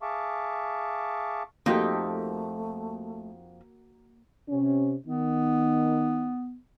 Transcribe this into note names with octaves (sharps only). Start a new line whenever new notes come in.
G#4 E5 F5 A5 C#6 D6
F2 A3 A#3 D#4 F#4 G4 A4
C3 C#4
D#3 B3 D#4